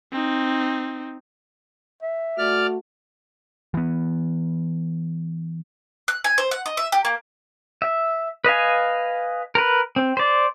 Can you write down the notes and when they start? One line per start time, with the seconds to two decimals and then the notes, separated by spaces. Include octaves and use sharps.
0.12 C4 D#4
2.02 E5
2.38 A3 F#4 D5 F6
3.74 E3 B3
6.08 F#6
6.24 G#5
6.38 C5
6.51 F#5
6.66 D#5
6.77 E5
6.92 G4
7.05 A#3
7.82 E5
8.44 B4 D#5 F5 G#5
9.55 A#4 B4
9.96 C4
10.17 C5 D5